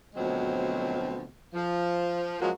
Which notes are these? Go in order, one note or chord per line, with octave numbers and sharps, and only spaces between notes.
D2 B2 F3 F#3 G#3 C4
F3
F3 F#3 G#3 A#3 C#4 F#4